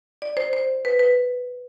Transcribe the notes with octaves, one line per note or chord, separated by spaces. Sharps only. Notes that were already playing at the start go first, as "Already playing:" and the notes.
D5
C5
C5
B4
B4